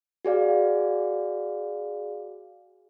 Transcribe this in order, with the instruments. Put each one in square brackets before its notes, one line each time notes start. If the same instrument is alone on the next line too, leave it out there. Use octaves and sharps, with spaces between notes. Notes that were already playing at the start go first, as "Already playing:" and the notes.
[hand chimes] F#4 G#4 D5 F5